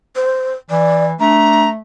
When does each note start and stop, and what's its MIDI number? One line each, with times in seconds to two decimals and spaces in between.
0.16 0.52 72
0.70 1.14 52
0.70 1.05 74
1.20 1.81 57
1.20 1.66 62
1.20 1.69 82